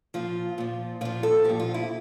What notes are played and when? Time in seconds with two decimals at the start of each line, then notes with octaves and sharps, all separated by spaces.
0.14 A#2 F3 F4
0.58 A#2 F3
1.01 A#2 F3 F4
1.23 A4
1.44 A#2 F3 G4
1.60 F4
1.74 E4